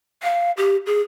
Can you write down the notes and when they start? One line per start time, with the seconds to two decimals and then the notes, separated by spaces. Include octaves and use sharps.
0.23 F5
0.57 G4
0.87 G#4